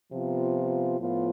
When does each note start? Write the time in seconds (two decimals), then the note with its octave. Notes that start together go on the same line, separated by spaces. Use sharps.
0.12 C3 F3 B3 F4
1.00 A2 F3 B3 F4